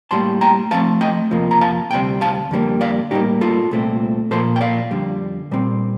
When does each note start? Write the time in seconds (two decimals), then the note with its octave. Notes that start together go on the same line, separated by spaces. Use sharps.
0.11 A2 G3 A#3 A5 C6
0.41 G5 A#5
0.71 A2 F3 A3 C4 F5 A5
1.01 D#5 G5
1.31 F2 C3 F3 A#3
1.51 A#5
1.61 F5 A5
1.91 D2 C3 G3 C4 G5
2.21 F5 A5
2.51 F2 D3 G3 A#3
2.81 D5 F5
3.11 A2 G3 A#3 D#4 G4
3.41 F4 A4
3.71 C2 A#2 A3 C4
4.31 A#2 F3 A#3 A4 C5
4.56 G5
4.61 D5 F5
4.91 F2 D3 G3
5.51 A#2 G3 C4